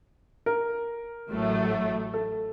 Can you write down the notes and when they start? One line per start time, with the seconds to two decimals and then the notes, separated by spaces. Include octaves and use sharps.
0.46 A#4
1.30 A1 A2 F#3 A3
2.14 A4